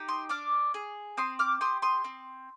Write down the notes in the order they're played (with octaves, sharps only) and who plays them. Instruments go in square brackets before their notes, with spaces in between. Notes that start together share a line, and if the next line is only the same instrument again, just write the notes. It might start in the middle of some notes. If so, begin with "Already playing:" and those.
Already playing: [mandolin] D#4 G4
C6 D#6
D4 D6 F6
G#4
C4 C6 D#6
D6 F6
G4 C6 D#6
C6 D#6
C4